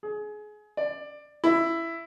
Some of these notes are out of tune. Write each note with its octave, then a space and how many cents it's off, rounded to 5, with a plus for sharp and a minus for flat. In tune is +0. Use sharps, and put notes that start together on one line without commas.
G#4 +25
D5 +15
E4 +10